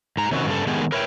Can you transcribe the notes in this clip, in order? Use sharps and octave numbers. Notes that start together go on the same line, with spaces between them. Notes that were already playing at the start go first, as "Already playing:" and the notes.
G#2 A#5
C3 D#3 F#3 C#4 F#4
G2 C#3 A4
D#3 G#3 A3 B3 G4 G#4
A#4 B4 C#5 E5 F#5 G5